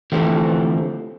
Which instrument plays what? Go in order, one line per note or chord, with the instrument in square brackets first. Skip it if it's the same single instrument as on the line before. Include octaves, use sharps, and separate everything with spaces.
[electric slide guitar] D3 E3 F3 A3 C4 G4